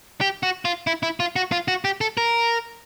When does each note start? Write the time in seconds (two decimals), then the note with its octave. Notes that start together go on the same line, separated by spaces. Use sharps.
0.21 G4
0.43 F#4
0.65 F4
0.87 E4
1.03 E4
1.20 F4
1.36 F#4
1.52 F4
1.68 F#4
1.85 G4
2.01 A4
2.17 A#4